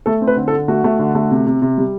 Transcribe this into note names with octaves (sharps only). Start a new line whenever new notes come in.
A3 A4
C4
B4
D3
A4
D3
A3 F#4
A3
D3
A3
C3
C3
C3
G3